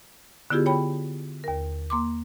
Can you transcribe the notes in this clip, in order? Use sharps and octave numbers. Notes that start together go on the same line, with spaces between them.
D3 B3 E4 F4 G4 G#4
C#5 G5 B5
D#2 A#4
A#3 C6 D6